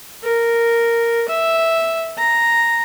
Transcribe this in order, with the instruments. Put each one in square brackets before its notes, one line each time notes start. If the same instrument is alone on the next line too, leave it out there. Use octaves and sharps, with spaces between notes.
[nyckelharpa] A#4
E5
A#5